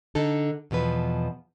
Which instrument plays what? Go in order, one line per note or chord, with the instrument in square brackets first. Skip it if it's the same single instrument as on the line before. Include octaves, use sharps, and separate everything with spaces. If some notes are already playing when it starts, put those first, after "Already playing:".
[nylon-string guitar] D3 D#4 A4
E2 B2 F3 B4